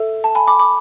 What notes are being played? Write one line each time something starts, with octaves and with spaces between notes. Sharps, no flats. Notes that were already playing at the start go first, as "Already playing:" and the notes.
Already playing: A4 E5
A5
G#5 B5
B5 D6
B5 D6